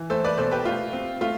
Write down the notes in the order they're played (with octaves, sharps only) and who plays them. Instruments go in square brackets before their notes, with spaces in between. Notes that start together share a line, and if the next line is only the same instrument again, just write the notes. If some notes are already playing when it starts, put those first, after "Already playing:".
Already playing: [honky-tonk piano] E3
A3 A4 C5
B4 D5
B2 A4 C5
G4 B4
A3 F4
C4
A3 F4